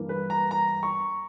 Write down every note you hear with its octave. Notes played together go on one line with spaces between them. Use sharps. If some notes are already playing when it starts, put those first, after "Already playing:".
Already playing: G2 E3 A#3
B4
A#5
A#5
C#6